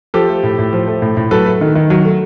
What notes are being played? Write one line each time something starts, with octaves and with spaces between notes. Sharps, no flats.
F3 G4 A4
A3
A2
A2
F3
A3
A2
A2
F#3 A4 B4
A3
D#3
D#3
F#3
A3